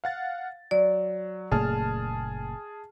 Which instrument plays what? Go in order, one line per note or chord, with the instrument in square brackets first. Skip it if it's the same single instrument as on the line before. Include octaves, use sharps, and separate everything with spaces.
[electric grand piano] F5 F#5 A6
[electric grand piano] F#3 [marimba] D5
[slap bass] F#1 A#2 A3 [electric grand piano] G#4 A5 F6